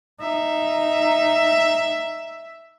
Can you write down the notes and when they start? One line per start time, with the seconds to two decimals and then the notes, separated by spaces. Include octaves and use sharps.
0.22 D#4 E5